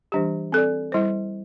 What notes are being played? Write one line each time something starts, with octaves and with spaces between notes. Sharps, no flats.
E3 G3 D4 G4
C4 A4 D5
G3 E4 C5